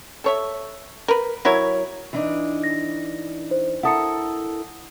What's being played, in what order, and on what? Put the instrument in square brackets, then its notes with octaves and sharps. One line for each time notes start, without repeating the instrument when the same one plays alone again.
[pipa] A4 C#5 E5
A#4 B4
F#3 E4 A#4 C#5
[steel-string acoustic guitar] E3 D4 D#4
[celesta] A#6
C5
[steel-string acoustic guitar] E4 A4 A#4 [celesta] F#5 D#6 C#7